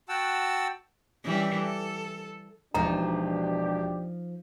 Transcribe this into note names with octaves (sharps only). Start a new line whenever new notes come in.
F#4 F#5 G5 A5 E6
E3 G3 C#4
A4
E1 B2 F3 D4 D#4 G4 A#5